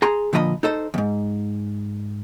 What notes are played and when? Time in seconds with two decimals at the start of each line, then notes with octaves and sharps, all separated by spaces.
0.02 G#4 A#5 C6
0.33 A#2 D3 F3 D#5 A#5 B5
0.63 D#4 A4 C5
0.94 E2 G#2